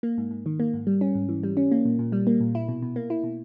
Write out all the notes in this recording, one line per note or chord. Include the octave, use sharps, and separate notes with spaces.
A#3
G#2
G#2
D#3
A#3
G#2
G3
C#4
G#2
E3
G3
C#4
A#3
A#2
A#2
G3
A#3
A#2
E4
B2
B2
A#3
E4
B2